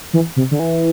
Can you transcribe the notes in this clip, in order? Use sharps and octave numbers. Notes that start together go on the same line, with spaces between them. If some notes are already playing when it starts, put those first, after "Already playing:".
E3
C3
D3
E3